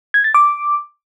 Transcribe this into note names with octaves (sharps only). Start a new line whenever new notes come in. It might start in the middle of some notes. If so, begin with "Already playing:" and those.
G#6
A6
D6